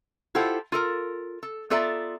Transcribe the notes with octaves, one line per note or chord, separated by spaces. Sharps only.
E4 F4 G4 A4 C5 F#5
F4 A4 A#4
A4
B3 F4 A4 D5 E5 A#5